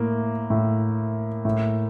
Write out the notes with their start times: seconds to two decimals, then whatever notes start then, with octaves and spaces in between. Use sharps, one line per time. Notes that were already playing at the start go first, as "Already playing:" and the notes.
Already playing: A2 A#3
0.50 A2
1.45 A2